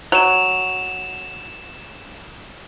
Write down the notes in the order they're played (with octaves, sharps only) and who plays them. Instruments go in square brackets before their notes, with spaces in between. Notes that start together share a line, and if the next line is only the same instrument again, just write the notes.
[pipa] F#3 [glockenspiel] E7 F7